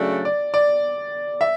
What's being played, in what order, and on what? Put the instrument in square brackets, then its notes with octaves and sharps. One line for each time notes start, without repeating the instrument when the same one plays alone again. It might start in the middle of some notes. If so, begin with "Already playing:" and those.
Already playing: [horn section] C#3 F#3 A3 D4 F#4 [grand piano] D5
[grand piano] D5
D5
E5